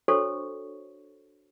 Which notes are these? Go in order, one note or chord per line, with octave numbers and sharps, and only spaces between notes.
D4 F#4 A4 C5 C#5 C#6